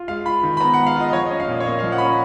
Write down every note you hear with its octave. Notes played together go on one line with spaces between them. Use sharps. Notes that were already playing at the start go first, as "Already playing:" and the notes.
Already playing: F4
G#3 F5
F4 B5
D#3
B5
B3 A#5
F#5
G#3
F5
F4 D#5
D#5
F3 C#5
D#5
C#4
F5
A#2
C#5
A#3 D#5
F5
F3
F#5
B5
C#4 A#5